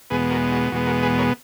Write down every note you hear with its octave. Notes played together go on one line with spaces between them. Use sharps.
E2 B2 G#3 B3 G#4 B4
F#4 A#4
F#4
E2 B2 G#3 B3 F#4
F#4 A#4
G#4 B4
A#4 C#5